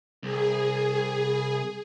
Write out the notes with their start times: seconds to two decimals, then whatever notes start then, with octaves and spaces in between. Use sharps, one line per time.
0.23 C2 G#4